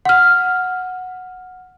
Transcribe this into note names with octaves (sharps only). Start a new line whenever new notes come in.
F#5 F6